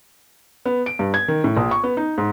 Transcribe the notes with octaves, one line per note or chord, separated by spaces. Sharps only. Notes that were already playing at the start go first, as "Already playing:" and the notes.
B3
D7
G2
G#6
D#3
A2
A#1
C#6
B3
D#4
G#2